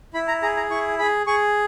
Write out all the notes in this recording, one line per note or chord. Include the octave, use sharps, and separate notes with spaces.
E4 B5
A#5
G#4 A#5
A#5
E4 C#6
G#4 B5
G#4 C#6